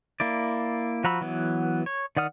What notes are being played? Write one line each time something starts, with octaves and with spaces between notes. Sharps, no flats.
A#3 E4 D5
F3 F#4 A#5 B5 E6
E3 F#3 B3
C#5
D#3 D5 F#5 D#6 F6